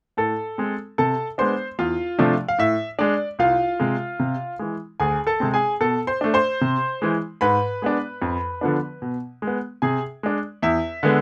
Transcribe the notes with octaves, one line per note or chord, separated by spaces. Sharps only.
A2 A4 A5
G#3 C4
C3 A4 A5
G#3 B3 D4 C5 C6
E2 F4 F5
C3 F3 A3 D4
F5
A2 E5
G#3 D4 D5
C2 F4 F5
C3 G#3
C3
E3 G#3
D2 G#4 G#5
A4 A5
C3 G#3 C4
G#4 G#5
B2 A4 A5
C5 C6
A3 D4
C5 C6
C3
E3 G#3
G#2 B4 B5
G#3 B3 D4
F2
D3 F3 B3 D4
B2
G#3
B3
C3 G#4 G#5
G#3 D4
E2 E5
D3 G#3 B3